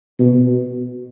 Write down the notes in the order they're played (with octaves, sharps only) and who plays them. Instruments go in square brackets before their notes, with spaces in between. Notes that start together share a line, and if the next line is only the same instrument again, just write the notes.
[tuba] B2